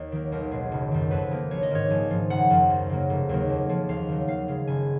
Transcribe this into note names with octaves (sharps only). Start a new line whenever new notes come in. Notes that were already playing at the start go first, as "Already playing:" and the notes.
Already playing: D#2 C#5 D#5
D#3 F#3 A#3
B1 A#4
B2 G#3
F#1
F#2 D#3
F2 B4
D#3 A#3
A#1 C#5
D#5
G#2 D#3 A#3 C#5
A#1 G#5
G#2 F3
F#1 F#5
F#2 F3 A#3
D#2
C#3 F#3 A#3
F1
D#2 D#3 F#3 A#3
F2
C#3 F3
D#2 F5
D#3 F#3
D#2 F5
C#3 G#3
F#1 G#5